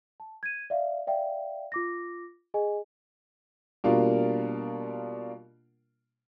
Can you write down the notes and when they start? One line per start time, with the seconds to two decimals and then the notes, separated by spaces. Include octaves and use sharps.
0.20 A5
0.43 G#6 D#7
0.70 D5 E5 F5
1.07 D5 E5 F5 G5
1.72 F4 D6 A#6
2.54 G#4 D#5 G#5
3.84 B2 G3 A#3 D4 F4 A#4